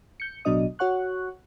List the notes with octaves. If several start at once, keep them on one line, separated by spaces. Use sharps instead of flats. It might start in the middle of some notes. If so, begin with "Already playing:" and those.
G6 C#7
A1 B2 F#3 D4 D#5 D#6
F#4 C#5 F#5 C#6 F#6